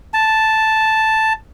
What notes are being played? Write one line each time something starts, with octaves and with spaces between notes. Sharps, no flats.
A5